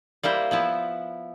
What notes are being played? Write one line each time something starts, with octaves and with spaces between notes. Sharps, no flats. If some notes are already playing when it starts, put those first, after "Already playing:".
G3 A#3 E4 C5
F3 B3 E4